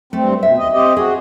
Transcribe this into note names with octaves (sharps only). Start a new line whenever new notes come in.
G2 A3 C4
B2 E5
D#2 D#5
C4 G4 D#5
F#4 G#4